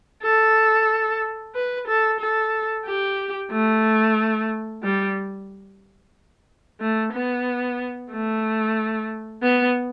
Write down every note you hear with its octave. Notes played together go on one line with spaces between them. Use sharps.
A4
B4
A4
A4
G4
A3
G3
A3
B3
A3
B3